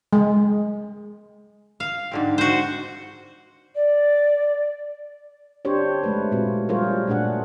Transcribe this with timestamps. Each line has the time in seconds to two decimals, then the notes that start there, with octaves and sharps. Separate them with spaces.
0.13 G#3
1.80 F5
2.12 G#2 D3 C4
2.38 F#4 C5
3.75 D5
5.65 D4 G4 C5 C#5
6.03 G#3 A3 B4
6.32 A#2 C4 F4 F#4
6.69 G3 F4 G#4 A#4 C5 C#5
7.07 A#2 A3 D4 G#4 F#5